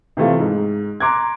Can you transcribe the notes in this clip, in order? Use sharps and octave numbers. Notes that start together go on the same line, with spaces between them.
C3 E3 A3 F4
G#2
A#5 C6 D6 F#6 G#6